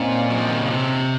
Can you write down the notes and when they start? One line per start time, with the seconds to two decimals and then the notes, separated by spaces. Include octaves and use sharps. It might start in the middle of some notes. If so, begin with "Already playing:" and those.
Already playing: A#2 C4 C#4 D#4
0.30 F#3
0.39 F3
0.50 D#3
0.59 C#3
0.70 C3